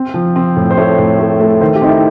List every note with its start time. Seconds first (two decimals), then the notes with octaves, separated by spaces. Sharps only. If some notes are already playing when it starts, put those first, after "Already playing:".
Already playing: C4
0.14 F3
0.36 C4
0.56 A2
0.71 C5
0.77 A3 C#5
0.98 A2
1.19 A3
1.40 A3
1.61 D#3 C5
1.75 G4
1.81 C4 D#4
1.89 E4